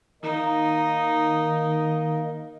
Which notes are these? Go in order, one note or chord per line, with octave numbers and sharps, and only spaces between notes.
D#3 A#3 D#4 A#4 D#5